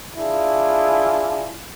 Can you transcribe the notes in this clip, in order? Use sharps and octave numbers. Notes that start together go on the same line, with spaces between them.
D4 E4 F4 G#4